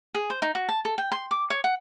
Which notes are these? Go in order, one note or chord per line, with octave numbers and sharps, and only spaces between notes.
G#4
C5
D#4
F#4
A5
A4
G5
C6
D6
C#5
F#5